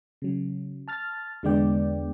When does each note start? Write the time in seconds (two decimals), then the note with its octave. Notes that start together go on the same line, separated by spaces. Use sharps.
0.22 C#3 F#3
0.88 A5 F6 A6
1.43 E2 D3 G#3 B3 D5 G5